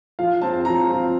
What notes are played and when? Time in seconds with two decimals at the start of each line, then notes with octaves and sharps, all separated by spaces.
0.19 F3 F5
0.42 C4 F4 A5
0.65 F3 A#5
0.89 C4 F4